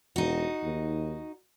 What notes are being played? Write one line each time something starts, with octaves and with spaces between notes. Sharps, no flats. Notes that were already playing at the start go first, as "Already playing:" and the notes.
E1 D#4 F#4
D#2